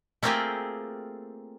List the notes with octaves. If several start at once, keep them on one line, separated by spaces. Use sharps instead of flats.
A3 A#3 C4 F4 G4 G#4